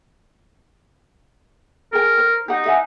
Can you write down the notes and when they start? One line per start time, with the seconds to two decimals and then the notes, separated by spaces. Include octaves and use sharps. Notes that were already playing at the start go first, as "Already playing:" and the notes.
1.93 G#4 A#4 G5
2.18 C5
2.48 D#4 G4 F#5
2.66 E5 F#5 G#5